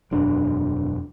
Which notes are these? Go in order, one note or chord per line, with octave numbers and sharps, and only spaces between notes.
E1 F#2 D4